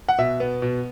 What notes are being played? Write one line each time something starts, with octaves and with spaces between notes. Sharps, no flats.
F#5
B2 E5
B3
B2